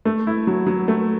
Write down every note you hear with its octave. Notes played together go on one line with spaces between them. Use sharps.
A3
E4
F#3
F#3
A3